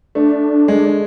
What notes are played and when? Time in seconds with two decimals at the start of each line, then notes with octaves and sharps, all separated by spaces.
0.15 A3 D4
0.68 G#3